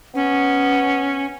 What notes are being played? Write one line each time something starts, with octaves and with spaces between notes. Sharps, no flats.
B3 C#4